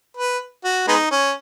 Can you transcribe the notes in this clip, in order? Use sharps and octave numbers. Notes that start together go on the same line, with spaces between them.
B4
F#4
G#3 B3 D#4
C#4